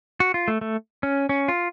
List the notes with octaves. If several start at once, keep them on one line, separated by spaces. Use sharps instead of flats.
F#4
F4
A3
A3
C#4
C#4
F4